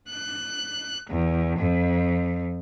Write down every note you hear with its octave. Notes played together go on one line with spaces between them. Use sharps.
F#6
E2
F2